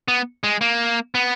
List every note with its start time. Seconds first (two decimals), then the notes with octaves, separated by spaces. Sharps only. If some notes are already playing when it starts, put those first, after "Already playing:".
0.08 B3
0.44 G#3
0.61 A#3
1.15 B3